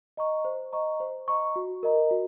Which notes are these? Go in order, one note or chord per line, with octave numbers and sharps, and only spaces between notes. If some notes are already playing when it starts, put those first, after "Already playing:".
D#5 A#5 C#6
C5
D#5 A#5 C#6
C5
D#5 A#5 C#6
F#4
A#4 D#5 A#5
F#4